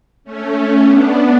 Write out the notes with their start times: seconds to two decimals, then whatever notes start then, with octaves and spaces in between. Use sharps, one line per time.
0.24 A3 C#4
0.81 B3 D4